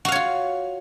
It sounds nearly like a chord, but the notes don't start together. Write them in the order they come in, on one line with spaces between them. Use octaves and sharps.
F#4 F5 C#5 F4